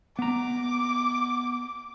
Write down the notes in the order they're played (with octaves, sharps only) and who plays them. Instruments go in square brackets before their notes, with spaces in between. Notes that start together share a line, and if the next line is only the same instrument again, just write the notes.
[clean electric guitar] B3 A#5 [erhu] D6